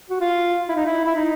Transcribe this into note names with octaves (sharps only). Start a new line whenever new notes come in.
F#4
F4
E4
D#4
E4
E4
D#4